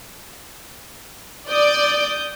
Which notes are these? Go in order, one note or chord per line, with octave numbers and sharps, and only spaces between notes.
D5 D#6 G6